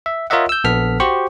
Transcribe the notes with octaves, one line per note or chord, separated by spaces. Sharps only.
E5
F4 A#4 C#5 D#5 E5 F#5
E6 G6
A#1 B3 A4 F6 B6
F#4 G4 C5 C#6